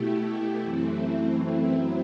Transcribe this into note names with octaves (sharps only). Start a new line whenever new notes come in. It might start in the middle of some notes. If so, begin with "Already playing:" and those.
Already playing: B2 A3 E4 G4
F#2 E3 A3 C4 E4
F#2 F#3 C4 E4